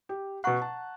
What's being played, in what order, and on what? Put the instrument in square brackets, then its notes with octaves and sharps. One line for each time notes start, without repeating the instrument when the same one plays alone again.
[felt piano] G4
[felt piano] B2 F#6 [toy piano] F#5 A#5 C#6
[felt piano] A5